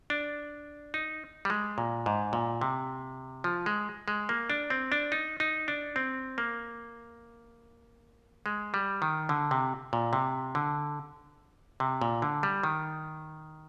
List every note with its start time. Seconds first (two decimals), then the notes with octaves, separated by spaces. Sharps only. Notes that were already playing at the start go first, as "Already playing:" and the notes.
0.10 D4
0.94 D#4
1.45 G3
1.50 G#3
1.78 A#2
2.06 G#2
2.33 A#2
2.61 C3
3.44 F3
3.66 G#3
4.08 G#3
4.29 A#3
4.50 D4
4.70 C4
4.92 D4
5.12 D#4
5.40 D#4
5.68 D4
5.96 C4
6.38 A#3
8.46 G#3
8.74 G3
9.02 D#3
9.29 D3
9.51 C3
9.93 A#2
10.13 C3
10.55 D3
11.80 C3
12.02 A#2
12.22 D3
12.43 G3
12.63 D#3